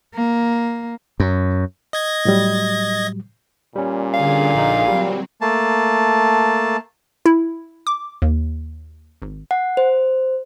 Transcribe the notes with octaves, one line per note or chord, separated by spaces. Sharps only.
A#3
F#2
D#5 G#6 A#6
A2 F#3 G3
A#2 G3 C#4
D3 G#4 F5
A#1 D#4
F#3 G3 C4
A3 A#3 A5
E4
D6
D#2
G#1
F#5
C5